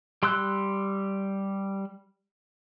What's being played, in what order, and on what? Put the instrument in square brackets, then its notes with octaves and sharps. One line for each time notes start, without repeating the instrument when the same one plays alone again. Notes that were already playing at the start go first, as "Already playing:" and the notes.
[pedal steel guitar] G3 C6 E6 F#6